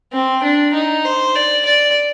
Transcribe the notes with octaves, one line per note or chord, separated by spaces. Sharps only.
C4
D4
D#4
C5
D5
D5